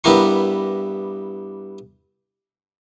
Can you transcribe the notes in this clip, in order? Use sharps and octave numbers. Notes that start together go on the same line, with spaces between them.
G2 B3 E4 G4 A#4 C#6